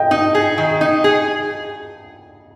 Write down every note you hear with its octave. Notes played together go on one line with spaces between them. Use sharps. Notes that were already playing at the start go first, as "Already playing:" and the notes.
Already playing: D#5 G5
D#4
G#4
D#3
D#4
G#4